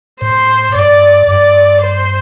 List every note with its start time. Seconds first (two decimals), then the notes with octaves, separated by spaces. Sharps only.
0.21 A2 C5
0.75 G2 D5
1.27 G2 D5
1.81 C5